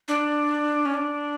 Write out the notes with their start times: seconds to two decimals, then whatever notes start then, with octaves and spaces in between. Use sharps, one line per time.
0.08 D4
0.85 C#4
0.94 D4